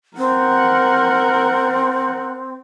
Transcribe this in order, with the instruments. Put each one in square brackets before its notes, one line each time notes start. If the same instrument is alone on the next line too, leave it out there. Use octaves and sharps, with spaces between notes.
[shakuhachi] C4 [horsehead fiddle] A#4 F#5